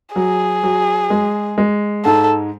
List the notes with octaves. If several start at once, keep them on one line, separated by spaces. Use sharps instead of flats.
F#3 G#4
F#3
G#3
G#3
G#2 A4